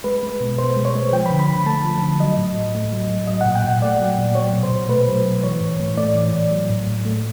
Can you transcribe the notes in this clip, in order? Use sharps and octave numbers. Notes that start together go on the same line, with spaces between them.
G#3 B4
G#3
B2
B2 C5
G#3
C#5
G#3
F3 G5
B5
D3
B5
D3
A3 A5
F3
D3
F#3 D#5
A2
A2
A3
F#3
A2
F#3 D#5
F#5
A#2
G5
A#2 F#5
A3 D5
F#3
A#2
F#3 C#5
B2
C5
B2
A3 B4
F#3
B2
E3 C#5
A2
A2
A3 D5
E3
A2
F#3
A2
A2
A3